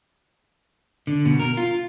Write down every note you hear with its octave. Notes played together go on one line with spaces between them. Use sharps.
D3
B2
A#4
F4